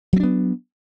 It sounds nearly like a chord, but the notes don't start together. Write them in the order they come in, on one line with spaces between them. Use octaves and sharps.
F#3 C4 D4 B3